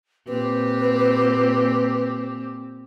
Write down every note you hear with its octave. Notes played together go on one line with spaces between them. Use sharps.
A#2 C4 G4 B4